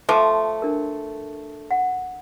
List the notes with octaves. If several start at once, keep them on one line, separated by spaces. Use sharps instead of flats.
F3 A3 D6
D4 A#4
F#5